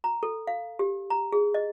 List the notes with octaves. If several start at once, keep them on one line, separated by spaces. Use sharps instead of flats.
A#5
A4
F5
G4
A#5
G#4
D#5